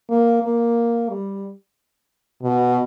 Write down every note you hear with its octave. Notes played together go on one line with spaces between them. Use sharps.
A#3
A#3
G3
B2